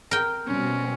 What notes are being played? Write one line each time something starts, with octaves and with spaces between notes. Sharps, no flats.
A#4 G5
B2 G3 C4 C#4